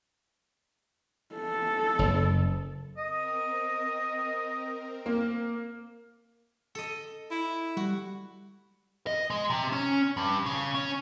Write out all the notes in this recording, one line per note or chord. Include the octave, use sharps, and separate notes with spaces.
A4
F#1
C4 A#4 D#5
A#3
A4 D#5
E4
G3 F#4
D#5
G#3
C3
C#4
G2
C#3
C#4